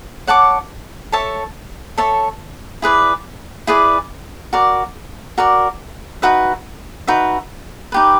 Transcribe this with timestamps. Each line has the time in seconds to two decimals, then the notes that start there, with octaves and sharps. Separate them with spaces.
0.27 C#5 F#5 A5 D6
1.12 A4 C#5 E5 A5
1.98 A4 C#5 E5 A5
2.82 E4 G#4 B4 D5
3.67 E4 G#4 B4 D5
4.53 F#4 A#4 D5
5.38 F#4 A#4 D5
6.22 D#4 F#4 B4 E5
7.07 D#4 F#4 B4 E5
7.92 D#4 G4 B4